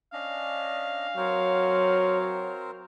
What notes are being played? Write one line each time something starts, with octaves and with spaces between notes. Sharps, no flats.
C#4 D4 D#5 F5
F#3 C4 A#4 C5 C#5